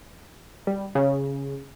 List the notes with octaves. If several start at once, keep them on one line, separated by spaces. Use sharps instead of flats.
G3
C#3